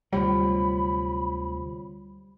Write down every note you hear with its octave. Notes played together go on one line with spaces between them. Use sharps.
D2 C3 F#3 G3 F4 C5 C#5 B5